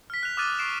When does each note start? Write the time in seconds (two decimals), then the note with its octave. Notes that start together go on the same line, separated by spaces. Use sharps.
0.10 F6 B6
0.23 F#6 F7
0.37 D6 D#6 F6 F#6 A6 D#7
0.59 C#6 C7 D7 E7